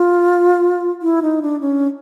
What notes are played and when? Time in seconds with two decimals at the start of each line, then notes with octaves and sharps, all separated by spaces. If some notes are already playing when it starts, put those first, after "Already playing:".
Already playing: F4
1.02 E4
1.22 D#4
1.42 D4
1.61 C#4